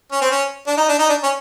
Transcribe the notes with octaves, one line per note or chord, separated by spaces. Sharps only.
C#4
C4
C#4
D4
D#4
D4
D#4
D4
C#4